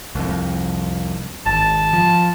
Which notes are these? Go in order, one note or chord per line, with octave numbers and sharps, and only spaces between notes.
C2 F2
G#1 A5
F3